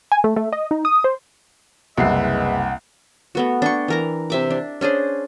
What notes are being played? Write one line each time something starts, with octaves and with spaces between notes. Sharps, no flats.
G#5
A3
A3
D#5
D#4
D#6
C5
F#1 C2 G#3 B4 E5 F#5 C7
A3 B3 F#4
D4 G5 C#6
E3 A#4 A#5
C3 E5 D6
D4
C#4 D4 G#4 C5